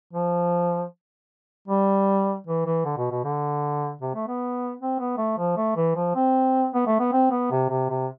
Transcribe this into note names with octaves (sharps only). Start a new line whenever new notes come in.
F3
G3
E3
E3
D3
B2
B2
D3
C3
A3
B3
C4
B3
A3
F3
A3
E3
F3
C4
B3
A3
B3
C4
B3
C3
C3
C3